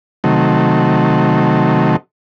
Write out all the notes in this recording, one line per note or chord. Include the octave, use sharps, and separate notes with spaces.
C3 D#3 F#3 A3